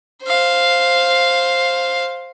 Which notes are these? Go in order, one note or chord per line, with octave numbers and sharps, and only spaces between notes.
C5 F5